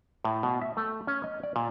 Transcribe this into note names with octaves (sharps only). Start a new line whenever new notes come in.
A2
B2
E5
A3
C#4
D#5
D5
A#2